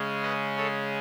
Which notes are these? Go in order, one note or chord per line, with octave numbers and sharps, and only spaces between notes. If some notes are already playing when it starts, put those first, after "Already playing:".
Already playing: C#3 G#3 C#4
B4 D#5
A4 C#5